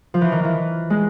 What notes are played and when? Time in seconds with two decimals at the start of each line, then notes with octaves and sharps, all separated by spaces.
0.14 F3
0.21 E3
0.32 D#3
0.44 E3
0.90 G#3